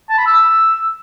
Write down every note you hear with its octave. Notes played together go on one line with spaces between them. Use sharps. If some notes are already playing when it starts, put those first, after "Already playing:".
A5
B5
E6